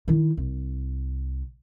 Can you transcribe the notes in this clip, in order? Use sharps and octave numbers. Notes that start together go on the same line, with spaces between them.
D#3 E4
C2